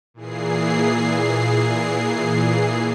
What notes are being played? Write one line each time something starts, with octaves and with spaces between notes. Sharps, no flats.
A#2 E3 G#4 C7